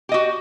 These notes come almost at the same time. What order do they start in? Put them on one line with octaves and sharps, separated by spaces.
G4 D#5 F#4